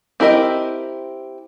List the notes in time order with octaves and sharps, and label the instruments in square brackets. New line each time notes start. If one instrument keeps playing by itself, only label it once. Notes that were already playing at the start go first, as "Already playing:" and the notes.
[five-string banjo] C4 E4 G4 A#4 D#5